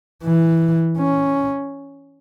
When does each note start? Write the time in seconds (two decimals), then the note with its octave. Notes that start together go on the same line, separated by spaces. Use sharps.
0.24 E3
0.97 C#4